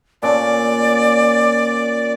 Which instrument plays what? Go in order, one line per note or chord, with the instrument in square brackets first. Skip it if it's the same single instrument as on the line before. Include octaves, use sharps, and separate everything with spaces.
[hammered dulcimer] A#2 C#4 [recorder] D5